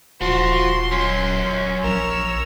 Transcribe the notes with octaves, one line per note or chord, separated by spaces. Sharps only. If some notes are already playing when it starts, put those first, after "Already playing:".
D#1 F3 F#4 C6
F#2 C#4
A#1 A#4 C#5 E6